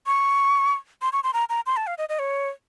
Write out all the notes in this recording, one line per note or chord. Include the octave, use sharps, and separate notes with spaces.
C#6
C6
C#6
C6
A#5
A#5
C6
A5
F5
D#5
D#5
C#5